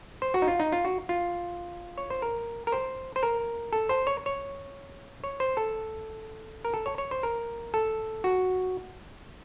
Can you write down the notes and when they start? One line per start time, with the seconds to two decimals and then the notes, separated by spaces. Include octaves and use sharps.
0.22 C5
0.34 F#4
0.42 D#4
0.48 F4
0.60 D#4
0.72 F4
0.85 F#4
1.09 F4
1.98 C#5
2.10 C5
2.22 A#4
2.67 A#4
2.72 C5
3.16 C5
3.23 A#4
3.73 A4
3.89 C5
4.07 C#5
4.26 C#5
5.24 C#5
5.40 C5
5.57 A4
6.65 A#4
6.74 A4
6.86 C#5
6.98 C#5
7.11 C5
7.23 A#4
7.74 A4
8.24 F#4